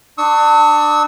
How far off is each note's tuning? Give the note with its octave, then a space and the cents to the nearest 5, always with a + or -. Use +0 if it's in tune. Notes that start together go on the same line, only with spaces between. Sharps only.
D4 +25 C#6 +0 E6 -40